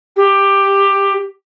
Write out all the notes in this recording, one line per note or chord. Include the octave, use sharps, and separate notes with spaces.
G4